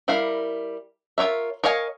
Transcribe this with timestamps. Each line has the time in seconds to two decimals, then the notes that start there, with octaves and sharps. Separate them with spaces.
0.08 G3 E4 A#4 F5
1.18 F4 A#4 C#5 E5
1.64 A#4 C#5 D#5 F5 G#5